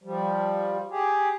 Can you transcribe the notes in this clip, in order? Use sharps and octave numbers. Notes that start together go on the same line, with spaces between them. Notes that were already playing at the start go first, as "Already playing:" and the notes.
F3 G3
G4 G#4